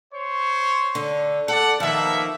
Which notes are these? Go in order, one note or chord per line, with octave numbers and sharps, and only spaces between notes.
C5 C#5
D3
A4 D5 F#5
D#3 F3 A#3 B3 E5